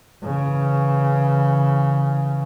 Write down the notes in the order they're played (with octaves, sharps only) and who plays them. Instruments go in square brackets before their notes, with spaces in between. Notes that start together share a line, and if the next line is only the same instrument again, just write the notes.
[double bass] C#3 E3